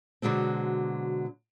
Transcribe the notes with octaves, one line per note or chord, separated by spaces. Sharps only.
B2 D3 F#3 G#3 C4